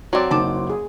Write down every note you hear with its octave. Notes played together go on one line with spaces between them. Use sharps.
F#3 C4 F#4 D5
F#1 D#4 A5 D6
G#4